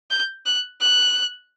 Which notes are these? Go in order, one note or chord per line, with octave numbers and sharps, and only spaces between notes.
G6
F#6
F#6